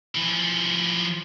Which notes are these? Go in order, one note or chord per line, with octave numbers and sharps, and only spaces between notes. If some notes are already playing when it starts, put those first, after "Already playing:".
E3 F3